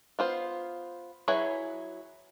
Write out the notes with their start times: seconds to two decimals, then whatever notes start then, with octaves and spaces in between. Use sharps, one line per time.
0.19 B3 F4 C5
1.28 F#3 E4 G#4 B4 C#5